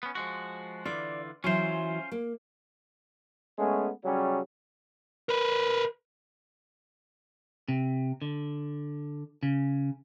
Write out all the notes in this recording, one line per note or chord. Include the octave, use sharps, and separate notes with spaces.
B3 C#4
F3 G#3 F#4
D3 E3 F4 D5
E3 F#3 C#4 F4 C5
A#3
G#3 A3 B3 C#4
C#3 F#3 G3 C#4
A#4 B4
C3
D3
C#3